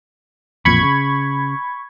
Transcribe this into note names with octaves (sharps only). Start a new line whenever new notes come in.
A1 F2 A#2 B5 C#6 G#6
C#3